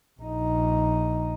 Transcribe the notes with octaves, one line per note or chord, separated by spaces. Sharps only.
A#1 D#4